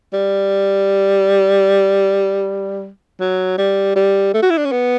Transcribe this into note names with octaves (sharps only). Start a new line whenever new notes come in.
G3
F#3
G3
G3
A3
F#4
E4
D4
C#4
B3